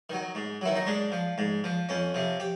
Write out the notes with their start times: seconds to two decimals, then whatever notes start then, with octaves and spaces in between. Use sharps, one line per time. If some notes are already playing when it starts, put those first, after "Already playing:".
0.10 D#3 F#3
0.35 G#2
0.61 D#3 F#3 E4
0.76 D#4
0.86 G#2 D4
1.12 F3
1.38 G#2
1.64 F3
1.89 F2 C#4
2.14 C3 F3
2.40 G4